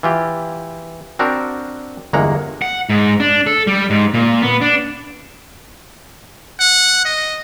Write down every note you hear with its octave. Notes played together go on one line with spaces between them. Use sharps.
E3 F4 G4
C4 D4 F#4 A#4
G1 E2 G#3 A#3 F#5 A#5
F#5
G#2
D4
A4
G3
G#2
A#2
B3
D4
F#5
D#5